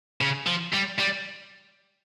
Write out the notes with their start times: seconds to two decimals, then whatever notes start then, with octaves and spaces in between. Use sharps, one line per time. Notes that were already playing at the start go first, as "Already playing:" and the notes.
0.21 C#3
0.47 F3
0.74 G3
0.99 G3